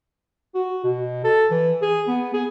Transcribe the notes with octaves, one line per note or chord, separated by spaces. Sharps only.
F#4
B2
A4
E3
G#4
B3
G#4